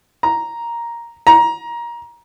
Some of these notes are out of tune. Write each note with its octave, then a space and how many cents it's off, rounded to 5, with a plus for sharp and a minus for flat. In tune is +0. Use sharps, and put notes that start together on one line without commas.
A#5 +5
A#5 +20